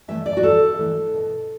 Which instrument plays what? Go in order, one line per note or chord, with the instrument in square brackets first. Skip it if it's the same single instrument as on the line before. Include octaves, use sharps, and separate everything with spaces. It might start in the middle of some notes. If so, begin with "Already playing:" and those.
[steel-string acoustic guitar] E3 A3 E5
D5
F#4
E2 A4
E3 A3
B2